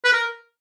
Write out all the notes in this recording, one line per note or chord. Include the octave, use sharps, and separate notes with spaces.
B4
A#4